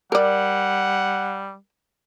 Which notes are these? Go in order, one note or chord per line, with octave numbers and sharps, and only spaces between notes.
G3 A#4 D5 F#5